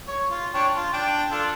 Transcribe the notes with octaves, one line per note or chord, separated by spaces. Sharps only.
C#5
F4
D4 C#5 G5
F4
D4 G5
D4 F4 A4